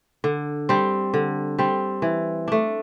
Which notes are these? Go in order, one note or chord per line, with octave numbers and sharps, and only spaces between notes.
D3
G3 C4
D3
G3 C4
E3
A3 D4